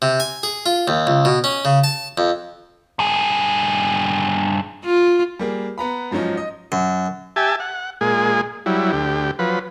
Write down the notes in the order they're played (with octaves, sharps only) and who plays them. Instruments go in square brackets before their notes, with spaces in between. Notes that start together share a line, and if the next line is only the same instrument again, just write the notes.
[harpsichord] C3
G#5
G#4
F4
D#2
C#2
B2
C#4
C#3
A5
F2
[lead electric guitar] G2 G#4
[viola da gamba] F4
[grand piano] G3 A#3 G#4
B3 A#5 B5
G#2 F3 F#3 C#4 D#4
D#5
[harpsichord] F#2
[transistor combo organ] G4 E5 G#5 A5
F#5
A#2 G#3 G#4
F#3 G3 E4
D2 G4
F3 F#3 B4